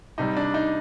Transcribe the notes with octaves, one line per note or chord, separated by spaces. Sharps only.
C3 G3 D#4
D4
D#4